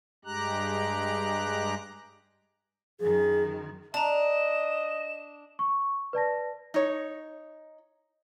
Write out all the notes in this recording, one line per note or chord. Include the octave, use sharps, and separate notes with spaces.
G2 G#3 G4 A#5 F#6
F#2 D#3 G#4
D4 D#5 A5 A#5 E7
C#6
B4 D5 A5 A#6
D#4 C#5